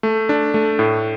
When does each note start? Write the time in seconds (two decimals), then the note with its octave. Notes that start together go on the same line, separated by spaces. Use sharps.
0.03 A3
0.29 D4
0.54 A3
0.79 A2